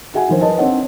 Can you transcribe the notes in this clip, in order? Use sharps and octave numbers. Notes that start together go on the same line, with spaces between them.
F#4 G#4 E5 F#5 G#5
D3 D#3 F3 A#4 C5
A#4 B4 C#5 D#5 A5
C4 D4 D#4 C#5 F#5